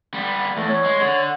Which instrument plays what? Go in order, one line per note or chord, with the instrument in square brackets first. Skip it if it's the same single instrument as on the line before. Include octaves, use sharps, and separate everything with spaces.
[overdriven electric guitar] G3 B3
[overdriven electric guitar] E2 [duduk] A3
[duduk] C#5
[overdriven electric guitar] G#3
D3